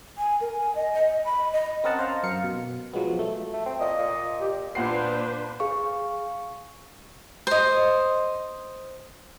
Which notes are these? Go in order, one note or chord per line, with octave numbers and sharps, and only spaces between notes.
G#5
A#4
G#5
D#5
D#5
B5
D#5
C4 C#4 A#4 D#5 F#5 A5
C5 F5 A#5
F#2 A#4 F5 C#7
B2
F3 F#3 G#3 B3
A3
A3
C4
A#2 D#5
A#2
G4
A#2 D4 B4 C5 F#5 C7
G#4 F5 C#6
C5 D#5